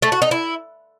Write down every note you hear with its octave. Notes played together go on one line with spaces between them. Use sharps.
A3
F#4
D#4
E4